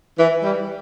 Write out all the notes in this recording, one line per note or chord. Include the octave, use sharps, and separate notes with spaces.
E3
G3